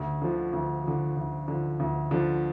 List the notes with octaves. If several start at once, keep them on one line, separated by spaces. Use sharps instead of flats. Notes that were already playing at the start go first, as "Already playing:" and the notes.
Already playing: D2
D3 F3
D2
D3 F3
D2
D3 F3
D2
D3 F3